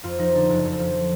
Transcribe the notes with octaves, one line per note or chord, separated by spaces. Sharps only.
F2 F4
F3 D#4
D3 D4
F#1 D4
F2
F3
D3